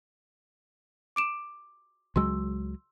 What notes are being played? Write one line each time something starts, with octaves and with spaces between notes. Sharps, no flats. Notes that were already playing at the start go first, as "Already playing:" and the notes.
D6 D7 E7
C#2 F#3 G#3 C6 E6